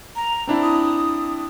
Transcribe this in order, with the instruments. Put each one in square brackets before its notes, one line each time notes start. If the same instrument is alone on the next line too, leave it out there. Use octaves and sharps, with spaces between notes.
[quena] A#5
[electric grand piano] C4 D4 E4
[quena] D#6